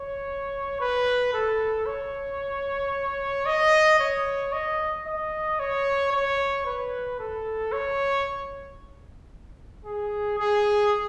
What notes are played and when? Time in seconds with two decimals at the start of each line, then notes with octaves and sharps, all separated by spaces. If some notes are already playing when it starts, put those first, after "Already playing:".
Already playing: C#5
0.80 B4
1.34 A4
1.86 C#5
3.46 D#5
4.00 C#5
4.53 D#5
5.07 D#5
5.60 C#5
6.12 C#5
6.66 B4
7.20 A4
7.72 C#5
9.85 G#4
10.39 G#4